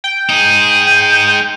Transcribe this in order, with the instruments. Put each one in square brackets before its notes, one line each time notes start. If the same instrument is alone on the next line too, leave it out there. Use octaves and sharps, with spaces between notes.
[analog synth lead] G5
[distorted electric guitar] D#4 G#4